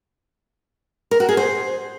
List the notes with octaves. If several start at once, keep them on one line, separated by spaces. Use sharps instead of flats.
A#4
F#4
G#4
C5